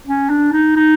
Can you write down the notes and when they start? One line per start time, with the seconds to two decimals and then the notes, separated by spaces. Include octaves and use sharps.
0.07 C#4
0.29 D4
0.52 D#4
0.76 D#4